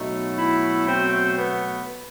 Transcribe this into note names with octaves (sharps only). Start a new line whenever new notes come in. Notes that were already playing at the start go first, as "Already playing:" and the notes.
Already playing: B2 F#3 A3 D#4
E4
C4
B3